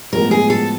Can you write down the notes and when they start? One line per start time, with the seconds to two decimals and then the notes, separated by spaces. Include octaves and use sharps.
0.13 A2 F3 G#3 B3 A#4
0.31 G#4
0.50 A4